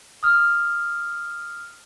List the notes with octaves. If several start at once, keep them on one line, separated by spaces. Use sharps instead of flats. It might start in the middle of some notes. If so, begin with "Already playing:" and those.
D#6 F6